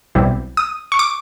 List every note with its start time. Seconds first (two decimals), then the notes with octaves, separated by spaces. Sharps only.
0.15 B1 B2 G3 C4 E4
0.57 D#6
0.92 C#6
0.99 D6